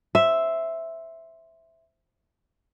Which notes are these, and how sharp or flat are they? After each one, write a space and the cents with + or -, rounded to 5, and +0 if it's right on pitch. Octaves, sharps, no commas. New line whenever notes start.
C5 +0 E5 +0